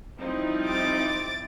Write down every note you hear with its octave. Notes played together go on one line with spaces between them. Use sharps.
F3 G3 C4 D#4 E4
D6 A6